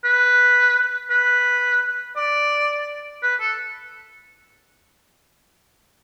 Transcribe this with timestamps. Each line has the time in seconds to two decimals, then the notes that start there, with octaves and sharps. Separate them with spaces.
0.04 B4
1.10 B4
2.16 D5
3.23 B4
3.40 A4